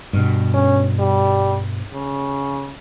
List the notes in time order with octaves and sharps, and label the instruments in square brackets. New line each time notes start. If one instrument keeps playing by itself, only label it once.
[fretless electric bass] G2 B2
[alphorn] C#4
G3
C#3